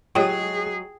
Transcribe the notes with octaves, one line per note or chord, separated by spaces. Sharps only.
F#3 G#3 F4 G4 G#4 C#5 G5